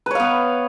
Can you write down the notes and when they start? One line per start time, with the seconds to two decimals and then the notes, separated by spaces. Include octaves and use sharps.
0.06 B4
0.11 C#5
0.15 F5
0.20 B3